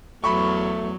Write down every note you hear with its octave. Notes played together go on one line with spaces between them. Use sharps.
E2 F#3 A3 B5 C#6